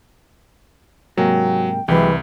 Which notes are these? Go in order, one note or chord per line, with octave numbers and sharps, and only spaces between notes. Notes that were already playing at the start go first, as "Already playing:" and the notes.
G#2 C3 F#3 A#3 G5
C2 E3 F#3 G#3 G4